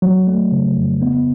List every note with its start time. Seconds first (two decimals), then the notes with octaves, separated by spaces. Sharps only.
0.02 F#3
0.27 A3
0.52 C#3
0.77 F2
1.02 B3